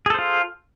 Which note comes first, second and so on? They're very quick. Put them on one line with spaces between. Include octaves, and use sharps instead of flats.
G#4 A4 C5 F4